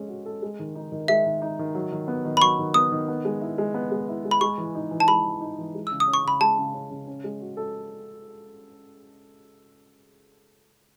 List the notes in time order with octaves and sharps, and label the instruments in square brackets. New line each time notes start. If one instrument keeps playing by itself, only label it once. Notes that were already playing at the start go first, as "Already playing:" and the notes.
Already playing: [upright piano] G#3 C#4 A4
F#4
A4
G#3
D#3
D#4
D#3
[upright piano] G#3 [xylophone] E5
[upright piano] D#3
D#4
D#3
F#3
D#3
B3
D#3
[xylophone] B5
[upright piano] F#3 [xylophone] C#6
[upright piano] D#3
[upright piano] B3 [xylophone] D#6
[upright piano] D#3
B3
G#3
E4
G#3
B3
G#3
E4
G#3
[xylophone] B5
[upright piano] G#3 [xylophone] C#6
[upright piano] E3
D#4
E3
[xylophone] A5
[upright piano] G#3 [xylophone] B5
[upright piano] E3
D#4
E3
G#3
[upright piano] C#3 [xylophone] E6
[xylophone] D#6
[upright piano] C#4
[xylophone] C#6
[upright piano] C#3 [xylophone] B5
[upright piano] G#3 [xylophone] A5
[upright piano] C#3
C#4
C#3
C#4
G#3
F#4
A4